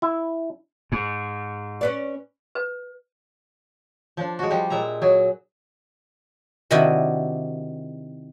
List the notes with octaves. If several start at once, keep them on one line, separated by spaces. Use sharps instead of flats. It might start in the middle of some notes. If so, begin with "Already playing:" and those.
E4
G#2
C#4 B4 D5
B4
F3 D4
G#3 F#4
F3 G3
A#2 G#3 E5 A#5
F#3 G#4
C3 D#3 D4 E4 F#4 D#5